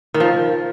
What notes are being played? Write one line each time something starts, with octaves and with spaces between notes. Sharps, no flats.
D#3
F3